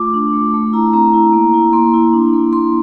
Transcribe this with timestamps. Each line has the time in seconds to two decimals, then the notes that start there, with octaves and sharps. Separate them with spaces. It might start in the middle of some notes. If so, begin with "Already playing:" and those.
Already playing: A3 F4 D6
0.14 D4
0.33 A3
0.54 A3
0.73 E4 A#5
0.93 C4 A#5
1.13 E4
1.33 A#3
1.54 E4
1.73 A#3 C6
1.94 E4
2.13 D4
2.33 A#3
2.53 A#3 C6